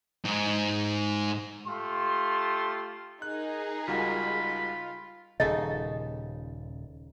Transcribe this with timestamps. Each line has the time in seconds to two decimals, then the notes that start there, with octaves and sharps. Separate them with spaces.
0.25 G#2
1.67 A3 F4 G4 C6
3.22 D#4 G#4 A#4 F#6
3.88 C#2 G3 F4 F#4 B5
5.40 D#1 A#2 C#3 D#4 A4 D#5